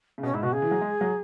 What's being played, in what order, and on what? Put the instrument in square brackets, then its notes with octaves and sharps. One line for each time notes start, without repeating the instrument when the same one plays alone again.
[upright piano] C#3
[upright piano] B2 [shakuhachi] C#4
[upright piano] G#2 [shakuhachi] E4
[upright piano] B2 [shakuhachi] F#4
[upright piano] C#3 [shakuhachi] G#4
[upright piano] E3
F#3
G#3
F#3